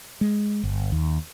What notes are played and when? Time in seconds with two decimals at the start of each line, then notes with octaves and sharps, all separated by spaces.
0.21 G#3
0.63 G1
0.92 D#2